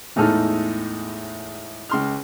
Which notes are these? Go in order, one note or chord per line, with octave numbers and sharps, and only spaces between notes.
E2 A2 G#3 D#4 A4 F6
C#2 C6 F6